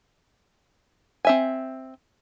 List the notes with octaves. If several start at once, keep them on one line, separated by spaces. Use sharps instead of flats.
C4 E5 G#5